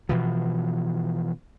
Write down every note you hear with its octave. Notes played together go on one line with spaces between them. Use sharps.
B2 E3 F3